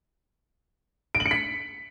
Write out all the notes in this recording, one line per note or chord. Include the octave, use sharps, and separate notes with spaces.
D7
F#7
C#7
B6